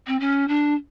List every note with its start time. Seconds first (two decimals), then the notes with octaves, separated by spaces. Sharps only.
0.07 C4
0.20 C#4
0.48 D4